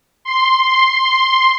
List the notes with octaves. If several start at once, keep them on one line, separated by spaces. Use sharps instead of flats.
C6